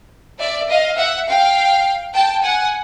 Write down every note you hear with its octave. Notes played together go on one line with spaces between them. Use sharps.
D5 E5
D#5 F5
E5 F#5
F5 G5
G5 A5
F#5 G#5